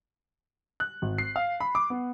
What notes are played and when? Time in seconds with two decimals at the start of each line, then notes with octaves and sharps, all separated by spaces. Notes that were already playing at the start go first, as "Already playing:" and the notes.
0.80 F#6
1.02 G#1
1.18 C7
1.36 F5
1.60 B5
1.75 D6
1.90 B3